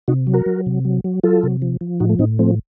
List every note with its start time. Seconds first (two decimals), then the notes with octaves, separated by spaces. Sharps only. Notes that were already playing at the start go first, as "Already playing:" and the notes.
0.08 C3 D#4 F#4
0.27 F#3
0.34 F#4 A#4
0.46 F#3
0.66 C3
0.85 F#3
1.04 F#3
1.23 F#3 F4 A4
1.43 C3
1.62 F3
1.81 F3
2.00 A2 D#4 F#4
2.09 A3
2.19 A2 C4 D#4
2.39 F3 A3 C4